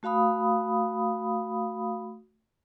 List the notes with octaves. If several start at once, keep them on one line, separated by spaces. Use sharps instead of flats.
A3 F#4 F5 B5 D#6